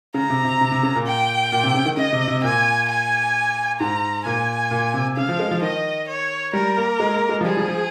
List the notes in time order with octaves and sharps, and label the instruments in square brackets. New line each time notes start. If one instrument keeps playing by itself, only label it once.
[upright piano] C#3 [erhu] A#5
[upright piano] C3
C3
C3
C3
C#3
A#2
[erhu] G5
[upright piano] A#2
C3
C#3
D#3
[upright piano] C#3 [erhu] D#5
[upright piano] C3
C3
[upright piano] A#2 [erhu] G#5
[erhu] G#5
[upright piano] G#2 [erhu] A#5
[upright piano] A#2 [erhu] G#5
[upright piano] A#2
C3
[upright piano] C#3 [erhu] F5
[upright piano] F3
G#3
F3
[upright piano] D#3 [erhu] D#5
[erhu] C#5
[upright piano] G3 [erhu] A#4
[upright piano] A#3
G#3
A#3
G#3
F3
[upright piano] G3 [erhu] G#4
[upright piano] F3
F3